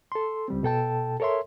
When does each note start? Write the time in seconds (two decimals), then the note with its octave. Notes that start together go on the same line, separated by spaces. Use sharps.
0.12 A4 C6
0.48 C#2 G3 C4
0.63 B2 A4 G5 A5
1.20 A4 A#4 C#5 E5 C6